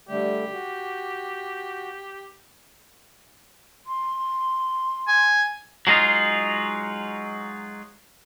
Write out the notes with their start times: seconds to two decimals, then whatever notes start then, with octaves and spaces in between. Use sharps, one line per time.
0.09 D3 G3 A3 G4
0.53 F#4
3.87 C6
5.08 G#5
5.87 F#3 G#3 D#4 F4